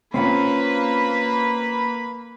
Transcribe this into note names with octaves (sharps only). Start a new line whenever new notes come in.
A#3 C4 C#4 F4 B4 B5